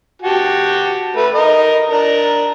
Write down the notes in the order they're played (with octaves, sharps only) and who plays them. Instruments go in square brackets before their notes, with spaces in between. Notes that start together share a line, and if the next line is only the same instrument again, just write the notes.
[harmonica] F#4 G4 A5
A3 B4
A#4 D#5
D4 A#4